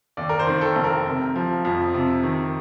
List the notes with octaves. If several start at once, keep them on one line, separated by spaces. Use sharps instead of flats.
D#2 D5
A#4
C5
D#3
A4
F1
A#4
C3
F3
F2
C3
D#3